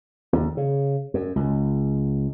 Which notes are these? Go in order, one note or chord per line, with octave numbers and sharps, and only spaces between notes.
D#2
C#3
F#2
C#2